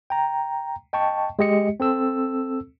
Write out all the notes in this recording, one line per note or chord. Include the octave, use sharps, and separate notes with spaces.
G5 A#5
D#5 G5 A5 C#6
G#3 G4 D#5 C#7
C4 A4 E6